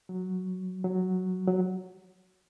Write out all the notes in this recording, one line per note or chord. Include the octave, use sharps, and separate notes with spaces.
F#3
F#3
F#3